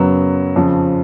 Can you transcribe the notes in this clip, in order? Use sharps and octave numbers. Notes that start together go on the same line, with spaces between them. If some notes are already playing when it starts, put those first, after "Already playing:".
Already playing: F#2 C#3 F#3 B3
F2 C#3 F3